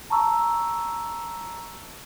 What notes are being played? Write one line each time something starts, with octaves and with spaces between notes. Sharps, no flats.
A5 A#5 C#6 E6